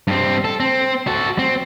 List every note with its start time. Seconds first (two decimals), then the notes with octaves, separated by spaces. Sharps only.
0.07 G2 C4
0.45 A4
0.60 C4
1.07 F#4 A4
1.39 C4